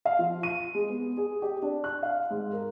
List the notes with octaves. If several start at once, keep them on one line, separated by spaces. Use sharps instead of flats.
F5
F3
D#7
G#3
B3
G#4
G4
D4
F#6
F5
G#2
A#4